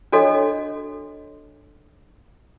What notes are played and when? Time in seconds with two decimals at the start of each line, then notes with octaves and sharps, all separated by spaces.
0.12 D4 F#4 A4 C#5 D#5